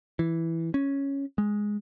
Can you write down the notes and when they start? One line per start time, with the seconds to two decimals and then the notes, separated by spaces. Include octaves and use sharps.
0.19 E3
0.74 C#4
1.38 G#3